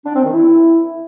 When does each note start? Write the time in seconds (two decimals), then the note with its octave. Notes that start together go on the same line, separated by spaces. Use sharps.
0.05 D4
0.14 C4
0.24 D#3
0.33 E4